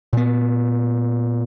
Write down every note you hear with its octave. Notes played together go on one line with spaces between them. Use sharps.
A#2 B3